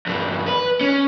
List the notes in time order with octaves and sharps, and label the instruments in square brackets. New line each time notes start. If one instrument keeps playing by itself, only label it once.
[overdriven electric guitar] E2 G2
B4
C#4